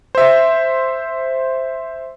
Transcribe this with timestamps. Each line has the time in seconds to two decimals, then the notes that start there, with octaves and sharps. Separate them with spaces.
0.15 C5 E5